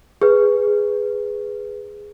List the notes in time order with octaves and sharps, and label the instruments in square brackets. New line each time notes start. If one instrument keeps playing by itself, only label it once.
[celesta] G#4 B4